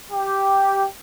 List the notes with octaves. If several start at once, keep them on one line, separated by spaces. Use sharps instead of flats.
G4